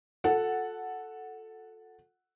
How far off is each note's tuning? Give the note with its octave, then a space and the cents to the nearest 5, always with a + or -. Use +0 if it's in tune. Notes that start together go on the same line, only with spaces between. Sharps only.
F4 +45 A4 +0 F#5 +0